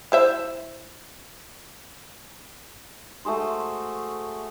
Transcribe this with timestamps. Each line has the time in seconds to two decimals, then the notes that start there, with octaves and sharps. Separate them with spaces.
0.12 E4 C5 E5
3.25 A3 F#4 G#4 C5